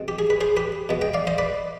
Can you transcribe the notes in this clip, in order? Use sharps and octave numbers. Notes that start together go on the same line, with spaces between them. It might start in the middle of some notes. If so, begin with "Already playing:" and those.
Already playing: B2 G#3 C4
G4
G#4
B4
G#4 C5
G4 B4
B2 G#3 B3
D#5 G5
D5 F5
C5 D#5
B4 D5